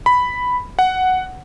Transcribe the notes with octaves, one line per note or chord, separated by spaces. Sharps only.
B5
F#5